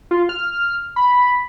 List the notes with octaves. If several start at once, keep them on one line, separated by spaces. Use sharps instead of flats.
F4
F6
B5